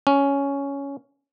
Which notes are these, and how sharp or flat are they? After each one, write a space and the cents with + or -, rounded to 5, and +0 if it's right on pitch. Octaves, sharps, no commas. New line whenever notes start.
C#4 +10